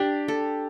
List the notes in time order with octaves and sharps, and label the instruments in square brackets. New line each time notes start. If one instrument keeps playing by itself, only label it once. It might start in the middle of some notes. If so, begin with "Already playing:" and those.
Already playing: [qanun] D4 [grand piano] G4
[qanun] A4